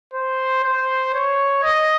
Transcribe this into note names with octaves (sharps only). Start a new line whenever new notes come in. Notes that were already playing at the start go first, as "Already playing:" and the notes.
C5
C5
C#5
D#5